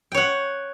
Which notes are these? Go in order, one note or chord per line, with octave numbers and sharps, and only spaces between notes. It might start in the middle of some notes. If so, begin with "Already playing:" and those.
C#5 F#5 G5